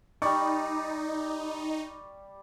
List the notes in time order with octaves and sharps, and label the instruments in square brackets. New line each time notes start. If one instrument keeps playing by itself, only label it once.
[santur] G3 D5 [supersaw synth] D#4 [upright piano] C#6